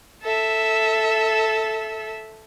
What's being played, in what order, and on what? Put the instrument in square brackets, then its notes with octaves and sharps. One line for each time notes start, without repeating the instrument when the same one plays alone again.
[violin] A4 E5